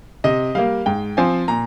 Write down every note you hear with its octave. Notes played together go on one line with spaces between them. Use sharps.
C3 D#5
G3 A#3 F5
G#2 G5
F3 C4 G#5
A#2 A#5